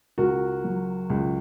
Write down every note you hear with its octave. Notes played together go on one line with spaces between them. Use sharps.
C#2 F#4 A#4
F#3
C#2